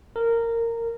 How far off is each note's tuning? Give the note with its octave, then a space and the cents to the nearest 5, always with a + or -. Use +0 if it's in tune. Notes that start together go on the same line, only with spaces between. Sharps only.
A#4 -15